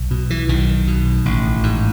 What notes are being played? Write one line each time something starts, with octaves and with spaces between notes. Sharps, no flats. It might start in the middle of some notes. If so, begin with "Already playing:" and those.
Already playing: B1
B2
E3
B1 D#3
B2
A1
G#2